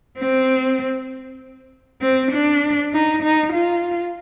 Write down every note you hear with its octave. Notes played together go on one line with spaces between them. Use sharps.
C4
C4
D4
D#4
D#4
F4